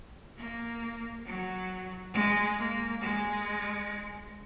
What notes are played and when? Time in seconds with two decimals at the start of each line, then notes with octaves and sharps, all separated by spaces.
0.37 A#3
1.26 F#3
2.14 G#3
2.58 A#3
3.01 G#3